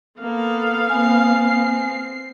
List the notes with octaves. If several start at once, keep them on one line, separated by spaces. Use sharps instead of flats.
A#3 B3 A4 F5
A#3 C4 G#5 C7